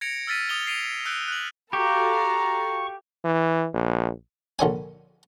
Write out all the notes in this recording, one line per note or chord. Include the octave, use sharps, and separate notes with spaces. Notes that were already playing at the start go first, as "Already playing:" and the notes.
G#6 A#6 C#7 D7 F7
E6 F6 A6 B6 D#7
D#6 F7 G7
C7 D7 D#7 F7
E6 F#6 G6 A#6 D7
F#6 F#7
F#4 G4 A4 F5 A#5 C#6
E3
A#1
A#1 D3 C#5 G#5